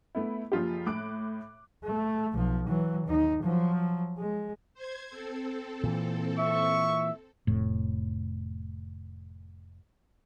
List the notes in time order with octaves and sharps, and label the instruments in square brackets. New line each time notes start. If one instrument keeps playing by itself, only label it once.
[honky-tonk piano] A3 B3 E4
F#1 F3 F4 G4
A2 D6 F#6 D7
[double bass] A3
B1 F3
E3 F#3
D#2 D#4
F3 F#3
G#3
[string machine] C5 G#6
C4 A4
[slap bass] A#2 E3
[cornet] E5 [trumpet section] C#6
[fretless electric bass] F1 A2